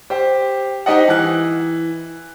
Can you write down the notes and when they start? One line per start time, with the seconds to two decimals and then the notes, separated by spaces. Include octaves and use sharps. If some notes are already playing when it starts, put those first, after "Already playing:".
0.10 G4 C5
0.86 D#4 G4 C5 D#5 F#5
1.08 E3 F#6